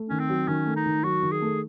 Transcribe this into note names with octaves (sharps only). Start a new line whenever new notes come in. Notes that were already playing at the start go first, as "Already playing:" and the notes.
Already playing: A3
D#3 C#4
C4
F#3
D#3 C#4
A3
D#4
D#3
F#3 F#4
D#3
G#4
A3